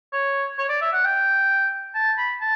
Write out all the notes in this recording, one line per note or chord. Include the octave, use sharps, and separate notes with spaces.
C#5
C#5
D5
E5
F#5
G5
A5
B5
A5